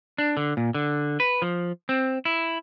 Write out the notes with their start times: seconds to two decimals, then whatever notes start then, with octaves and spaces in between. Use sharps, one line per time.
0.18 D4
0.37 D3
0.57 A#2
0.75 D3
1.20 B4
1.42 F3
1.89 C4
2.25 E4